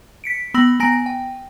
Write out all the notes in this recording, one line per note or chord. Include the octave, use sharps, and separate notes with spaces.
B6 C#7 D7
B3 B5 E6 A#6 F#7
B3 G#5 A#5 A#6 D7
G5